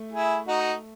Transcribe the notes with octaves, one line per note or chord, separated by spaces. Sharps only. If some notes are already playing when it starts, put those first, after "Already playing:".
Already playing: A3
E4 G#4
D#4 F#4